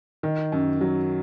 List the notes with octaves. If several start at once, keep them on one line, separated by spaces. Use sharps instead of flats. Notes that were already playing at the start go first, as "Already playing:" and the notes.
D#3
F#2
F#3